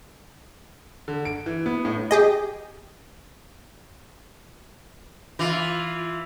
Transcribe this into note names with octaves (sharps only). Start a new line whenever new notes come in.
D3
D7
E3
B3
A2
G4 G#4 D#5
E3 F4